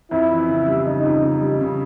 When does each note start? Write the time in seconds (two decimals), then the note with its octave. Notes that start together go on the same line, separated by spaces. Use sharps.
0.11 F2 E4
0.30 E3
0.48 C#3
0.67 G3
0.85 C#3 D#4
1.04 F2
1.23 C#3
1.41 G3
1.60 C#3